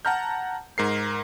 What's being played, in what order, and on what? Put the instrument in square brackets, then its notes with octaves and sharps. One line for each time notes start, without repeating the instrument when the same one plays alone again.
[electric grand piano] F#5 A5 A#5 F6 G6
G#2 A#4 C7